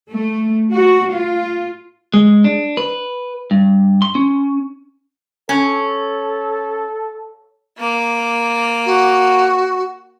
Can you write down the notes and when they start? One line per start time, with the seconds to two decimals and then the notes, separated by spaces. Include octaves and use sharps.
0.11 A3
0.72 F#4
1.13 F4
2.14 G#3
2.44 D4
2.77 B4
3.51 G2
4.02 C6
4.15 C#4
5.49 C#4 A4
7.78 A#3 D6
8.86 F#4